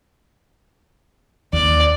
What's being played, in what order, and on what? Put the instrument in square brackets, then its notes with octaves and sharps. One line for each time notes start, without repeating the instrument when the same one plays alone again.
[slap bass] D#2 [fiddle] D5